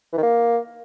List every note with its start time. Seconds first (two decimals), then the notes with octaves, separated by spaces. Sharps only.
0.13 E3
0.18 D#3
0.23 A#3